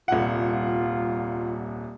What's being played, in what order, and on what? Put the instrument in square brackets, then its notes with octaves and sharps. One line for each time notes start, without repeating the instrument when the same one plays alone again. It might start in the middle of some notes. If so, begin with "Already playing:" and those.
[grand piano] D#1 C2 F#5 [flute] F4